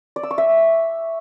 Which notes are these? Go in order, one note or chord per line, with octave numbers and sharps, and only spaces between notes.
D5
E6
C#6
E5